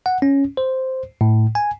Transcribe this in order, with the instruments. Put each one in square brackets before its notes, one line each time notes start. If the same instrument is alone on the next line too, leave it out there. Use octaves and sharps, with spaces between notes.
[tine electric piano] F#5
C#4
C5
A2
G#5